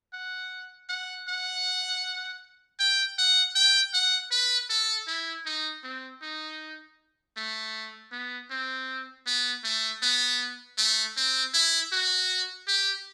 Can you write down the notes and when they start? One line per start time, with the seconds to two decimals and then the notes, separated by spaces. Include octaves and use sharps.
0.13 F#5
0.89 F#5
1.28 F#5
2.80 G5
3.18 F#5
3.55 G5
3.94 F#5
4.31 B4
4.70 A4
5.07 E4
5.46 D#4
5.84 C4
6.22 D#4
7.37 A3
8.12 B3
8.50 C4
9.27 B3
9.64 A3
10.02 B3
10.78 A3
11.17 C4
11.54 E4
11.92 F#4
12.68 G4